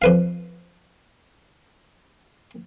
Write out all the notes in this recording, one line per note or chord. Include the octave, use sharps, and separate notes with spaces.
F2 B4 F5